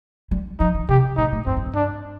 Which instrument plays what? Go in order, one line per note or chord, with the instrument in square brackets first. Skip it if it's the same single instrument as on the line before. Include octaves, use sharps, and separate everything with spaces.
[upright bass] G3
[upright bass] F3 [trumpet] D#4
[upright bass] D#3
[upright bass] C3 [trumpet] G4
[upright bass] A#2 [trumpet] D#4
[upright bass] A2
[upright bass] G2 [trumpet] C4
[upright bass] F2
G2
[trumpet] D4